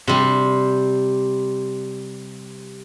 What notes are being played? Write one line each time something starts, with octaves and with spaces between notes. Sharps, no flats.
C3 G3